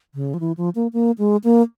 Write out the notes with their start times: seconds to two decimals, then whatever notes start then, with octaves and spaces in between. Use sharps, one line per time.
0.15 C#3
0.34 F3
0.40 E3
0.57 F3
0.75 A#3
0.93 A#3
1.18 G#3
1.44 A#3